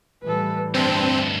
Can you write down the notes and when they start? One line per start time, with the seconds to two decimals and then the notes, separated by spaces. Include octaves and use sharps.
0.23 A2 E3 G3 A4 B4
0.74 D2 G2 C4 D4